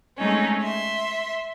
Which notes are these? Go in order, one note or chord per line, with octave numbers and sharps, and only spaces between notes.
G#3 A3 C4 C#4 D#4
E5 C6